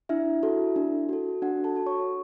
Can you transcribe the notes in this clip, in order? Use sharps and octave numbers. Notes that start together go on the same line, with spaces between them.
D4 E4 E5
F#4 A4
D4
F#4 A4
D4 F#4 F#5
A4 A5
F#4 A4
C#5 C#6